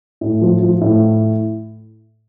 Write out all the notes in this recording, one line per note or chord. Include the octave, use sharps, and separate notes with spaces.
A2
F3
F3
A2